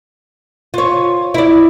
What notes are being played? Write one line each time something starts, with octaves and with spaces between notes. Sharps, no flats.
F4 C#5
E4 D5